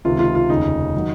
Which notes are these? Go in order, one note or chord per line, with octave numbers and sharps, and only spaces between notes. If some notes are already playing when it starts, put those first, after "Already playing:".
C#2 C3 D#3 F4
F4
F4
F1 D#2 C#3 D#4
D#3 F#3